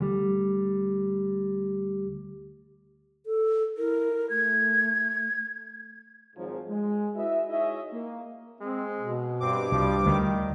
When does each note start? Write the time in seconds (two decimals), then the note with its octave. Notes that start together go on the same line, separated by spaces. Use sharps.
0.01 D2 G3
3.26 A4
3.78 E4 A#4
4.30 A3 G#6
6.36 G#1 G#2 F3 F#3
6.68 G#3
7.16 E4 F#4 B4 D#5 E5
7.49 D#4 E4 G#4 C#5 D#5 E5
7.92 A#3
8.61 G#3 C4
9.00 B2
9.41 G2 C4 D6
9.72 C2 F3 G3
10.06 D2 D#3